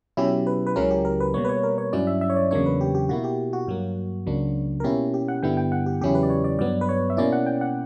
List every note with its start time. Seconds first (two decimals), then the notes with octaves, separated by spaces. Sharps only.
0.17 B2 F#3 C#4 E4 G4
0.47 B4
0.67 B4
0.76 C#2 C#3 F#3 C#4 E4 A#4
0.91 G4
1.05 A#4
1.20 B4
1.34 B2 G3 A#3 C#5
1.45 B4
1.49 C#5
1.63 A#4
1.78 C#5
1.93 G2 F#3 C#4 E4 D5
2.07 E5
2.21 E5
2.30 C#5
2.36 D5
2.51 E2 C#3 F#3 A#3 D4 C#5
2.66 B4
2.81 G4
2.95 G4
3.09 B2 A#3 E4 F#4
3.24 G4
3.53 F#4
3.68 G2 F#3 A#3
4.26 C#2 C#3 F#3 A#3 D4
4.80 A#4
4.84 B2 A#3 C#4 E4 G4
5.14 G4
5.28 F#5
5.43 G2 D3 G3 B3 E4 G5
5.57 G5
5.72 F#5
5.86 G4
6.01 E2 C#3 F#3 C#4 E4 G4
6.15 B4
6.23 D5
6.30 C#5
6.44 D5
6.59 G2 F#3 B3 D5
6.81 B4
6.89 C#5
7.10 E5
7.17 B2 A#3 C#4 E4 D5
7.33 F#5
7.46 G5
7.61 F#5